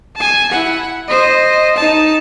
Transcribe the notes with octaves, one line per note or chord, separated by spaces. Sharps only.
G#5 A5
E4 F#5
C5 D#5
D#4 A5